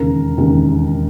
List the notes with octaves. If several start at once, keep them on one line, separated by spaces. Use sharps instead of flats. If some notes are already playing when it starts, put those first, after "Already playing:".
Already playing: E1 D#2 C#3 A#4
E1 D#2 C#3